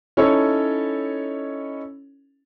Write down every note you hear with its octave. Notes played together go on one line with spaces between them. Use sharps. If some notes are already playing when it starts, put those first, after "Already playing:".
C#4 D#4 E4 A4 C#5